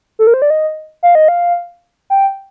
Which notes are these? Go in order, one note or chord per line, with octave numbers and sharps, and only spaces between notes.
A4
A#4
C5
D5
D#5
F5
D#5
F5
G5